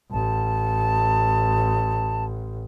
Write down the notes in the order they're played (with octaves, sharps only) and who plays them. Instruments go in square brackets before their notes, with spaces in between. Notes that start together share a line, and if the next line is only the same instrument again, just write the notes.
[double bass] A1 [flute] A5